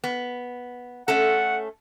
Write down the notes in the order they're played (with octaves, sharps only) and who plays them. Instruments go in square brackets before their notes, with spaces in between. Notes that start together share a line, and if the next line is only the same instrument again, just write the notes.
[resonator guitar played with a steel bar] B3
[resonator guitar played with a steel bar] A3 C#4 A4 [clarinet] F#5